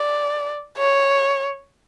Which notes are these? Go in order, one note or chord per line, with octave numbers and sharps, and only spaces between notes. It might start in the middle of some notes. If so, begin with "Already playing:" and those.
Already playing: D5
C#5